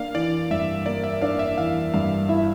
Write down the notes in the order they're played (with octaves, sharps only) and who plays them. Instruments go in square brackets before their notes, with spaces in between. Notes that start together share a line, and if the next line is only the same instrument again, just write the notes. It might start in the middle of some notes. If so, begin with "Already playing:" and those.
Already playing: [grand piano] A#3 D4 [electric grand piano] F5
[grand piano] E3 [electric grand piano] D5
[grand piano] G2 [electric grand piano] E5
[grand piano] A#3 [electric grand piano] D5
[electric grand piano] E5
[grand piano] D4 [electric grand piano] F5
[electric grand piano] E5
[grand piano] E3 [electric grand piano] F5
[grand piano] G2 [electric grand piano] F5
[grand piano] E4 [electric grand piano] E5